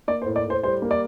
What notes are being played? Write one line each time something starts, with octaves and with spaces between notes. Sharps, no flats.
A#3 D5
C5
A2
D5
A2 C5
G3 C5
A#3
D5